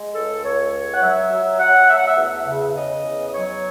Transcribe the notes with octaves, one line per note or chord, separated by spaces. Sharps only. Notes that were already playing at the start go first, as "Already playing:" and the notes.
Already playing: G#3
C#2 A4
C#2 C#5
C#2
F#5
F#3 E5
F#3
F#3 F#5
A3 E5
F#5
E5
E2
C#3
C#3 D#5
E2
D#5
F#3 C#5